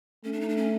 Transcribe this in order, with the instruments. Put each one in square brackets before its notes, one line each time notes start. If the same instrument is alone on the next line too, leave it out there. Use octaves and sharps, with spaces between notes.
[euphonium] A3 [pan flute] C#4
[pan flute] D4
D#4
D4
C#4